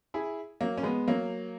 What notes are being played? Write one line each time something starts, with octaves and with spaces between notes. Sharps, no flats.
E4 G#4
F#3 A#3
C#4
G#3 B3
F#3 A#3